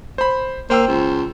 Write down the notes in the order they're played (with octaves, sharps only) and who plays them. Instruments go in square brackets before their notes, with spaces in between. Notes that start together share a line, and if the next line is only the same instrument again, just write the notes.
[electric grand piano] C5 B5
[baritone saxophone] A#3 [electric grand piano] C5 G5 E6
[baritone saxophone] C#2